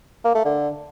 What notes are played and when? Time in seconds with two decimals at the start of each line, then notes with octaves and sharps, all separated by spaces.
0.25 A#3
0.35 A3
0.45 D3